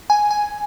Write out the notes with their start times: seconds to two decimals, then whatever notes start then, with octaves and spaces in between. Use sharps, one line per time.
0.10 G#5
0.31 G#5